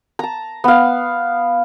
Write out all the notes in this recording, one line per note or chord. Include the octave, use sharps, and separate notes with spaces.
A5 A#5
B3 F5